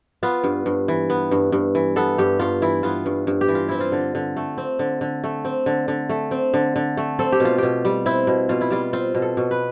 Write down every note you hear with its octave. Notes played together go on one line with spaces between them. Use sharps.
B3 F4
G2
G2
E3
B3
G2
G2
E3
B3 A4
G2 G4
G2 F4
E3 E4
B3 F4
G2
G2
G4
E3
F4
C4 E4
F4
D3
D3
A3
C4
D3
D3
A3
C4
D3
D3
A3
C4
D3
D3
A3
C4 A4
G4
B2 F4
B2 G4
G3
C4 E4
B2
B2 F4
E4
G3 F4
C4 F4
B2
A4
B2
B4